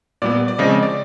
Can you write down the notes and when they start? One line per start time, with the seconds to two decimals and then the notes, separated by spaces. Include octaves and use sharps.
0.22 A#2 G3 B3 D5
0.48 D5
0.59 C#3 F3 G#3 C4 D#5
0.72 D#5
0.83 D5